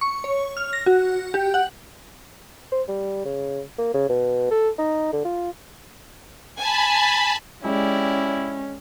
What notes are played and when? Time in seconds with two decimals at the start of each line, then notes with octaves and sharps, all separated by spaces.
0.01 C#6
0.24 C#5
0.57 F6
0.73 A#6
0.86 F#4
1.34 G4
1.54 F#5
2.72 C5
2.89 G3
3.25 C#3
3.78 A#3
3.94 C#3
4.09 B2
4.51 A4
4.78 D#4
5.13 D3
5.25 F4
6.59 G#5 A5 B5
7.64 G#3 C#4 E4 G4 D5